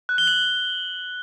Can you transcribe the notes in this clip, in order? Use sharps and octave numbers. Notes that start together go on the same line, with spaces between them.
F#6
G7
F#7